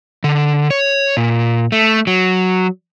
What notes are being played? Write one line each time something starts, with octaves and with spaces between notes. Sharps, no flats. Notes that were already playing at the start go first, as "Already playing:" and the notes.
D3
C#5
A#2
A3
F#3